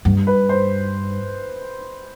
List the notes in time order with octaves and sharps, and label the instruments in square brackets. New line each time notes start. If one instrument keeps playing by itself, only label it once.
[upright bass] G2
[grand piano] B4
C5